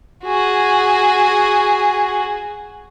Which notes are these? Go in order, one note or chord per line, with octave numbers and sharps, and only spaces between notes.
F#4 G#4